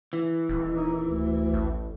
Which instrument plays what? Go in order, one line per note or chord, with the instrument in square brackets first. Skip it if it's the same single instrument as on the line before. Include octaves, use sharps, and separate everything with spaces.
[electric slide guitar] E3
[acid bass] D#1
[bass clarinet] D#4
D2
[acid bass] A1